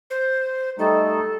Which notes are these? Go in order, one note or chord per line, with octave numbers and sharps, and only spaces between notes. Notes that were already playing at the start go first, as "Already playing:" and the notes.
C5
G3 A3 D#4 A4